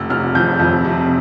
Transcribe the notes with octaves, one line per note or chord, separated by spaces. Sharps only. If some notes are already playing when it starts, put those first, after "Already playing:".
Already playing: F1 E6
F1 F6
F2 G6
F2
C3